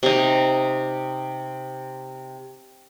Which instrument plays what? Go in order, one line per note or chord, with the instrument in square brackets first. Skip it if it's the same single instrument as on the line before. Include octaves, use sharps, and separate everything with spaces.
[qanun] C3 D#4